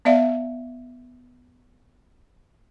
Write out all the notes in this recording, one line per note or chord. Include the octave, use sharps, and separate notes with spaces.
B3 D5 E5 F5